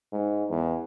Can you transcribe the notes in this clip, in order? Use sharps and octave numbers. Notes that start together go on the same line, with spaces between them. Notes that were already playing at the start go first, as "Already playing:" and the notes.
G#2
E2